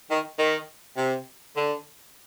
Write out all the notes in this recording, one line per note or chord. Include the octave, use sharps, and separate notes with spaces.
D#3
D#3
C3
D3